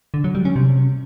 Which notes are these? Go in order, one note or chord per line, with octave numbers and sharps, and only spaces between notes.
D3
F#3
G3
C#4
C3